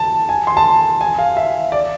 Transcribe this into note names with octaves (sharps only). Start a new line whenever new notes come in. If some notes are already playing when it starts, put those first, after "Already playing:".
Already playing: A5
G#5
C6
A5
G#5
F5
E5
D5